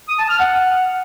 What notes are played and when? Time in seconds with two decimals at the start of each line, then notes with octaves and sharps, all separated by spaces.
0.08 D#6
0.19 A5
0.29 F6
0.39 F#5